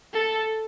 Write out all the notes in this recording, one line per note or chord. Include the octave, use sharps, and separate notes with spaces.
A4